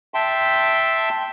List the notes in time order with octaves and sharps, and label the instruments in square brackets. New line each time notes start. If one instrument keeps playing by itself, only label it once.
[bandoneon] E5 G5 A5 C6